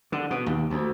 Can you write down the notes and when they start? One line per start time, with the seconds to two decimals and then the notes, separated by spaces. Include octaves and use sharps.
0.12 D3
0.31 B2
0.46 D#2
0.70 D2